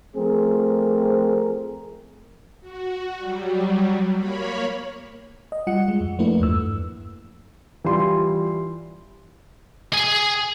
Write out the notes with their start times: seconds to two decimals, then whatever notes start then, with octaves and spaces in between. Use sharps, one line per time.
0.16 F3 A3 C4 G#4 A#4
2.61 F#4
3.18 F#3 G3
4.15 A#3 C#5 B5
5.52 D#5
5.67 G3 F4 F#5 C#7
5.88 G#3
6.01 F2
6.19 F3 A3 A#3 D4 E4 B4
6.40 E2 G2 E6
7.84 E3 G3 F4 C6
9.93 G#4 G#5